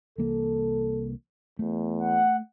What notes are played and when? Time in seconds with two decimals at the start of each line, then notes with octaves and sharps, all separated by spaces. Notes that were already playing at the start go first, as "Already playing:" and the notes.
0.18 C2 E3 A#3 A4
1.59 E2 A3
2.00 F#5